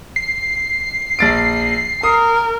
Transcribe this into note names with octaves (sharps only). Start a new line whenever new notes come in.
C7
A#1 A6 D7
A#4 D#6